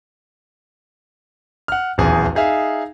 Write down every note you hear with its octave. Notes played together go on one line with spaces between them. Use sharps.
F#5 F6
D#1 B1 E2 G#4
D#4 G#4 E5 F5